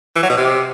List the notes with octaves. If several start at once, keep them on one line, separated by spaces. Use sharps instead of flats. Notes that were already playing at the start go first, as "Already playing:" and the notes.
E3
F#3
B2
C3